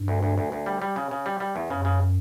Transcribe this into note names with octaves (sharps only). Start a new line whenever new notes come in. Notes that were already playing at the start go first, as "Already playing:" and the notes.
Already playing: G2
D2
D2
D2
D2
G3
G3
C#3
C#3
G3
G3
E2
F#2 C#3
C#3